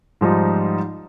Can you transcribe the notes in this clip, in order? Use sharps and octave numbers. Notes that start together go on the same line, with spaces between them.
G#2 F3 G3 D#4